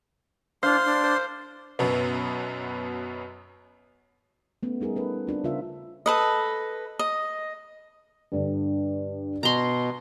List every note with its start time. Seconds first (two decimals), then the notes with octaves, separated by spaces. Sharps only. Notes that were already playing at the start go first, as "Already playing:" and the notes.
0.63 D4 C5 F5 C6
0.85 D4
1.04 C5
1.79 F#2 B2 B3
4.63 A3 B3 C#4
4.81 G3 D#4 G#4 A#4
4.96 C#4 A4 B4
5.27 C4 D4 F4
5.44 C#3 F4 A#4 E5
6.06 A4 B4 D#5
6.99 D#5
8.32 G2 D3
9.43 B2 A#5 C6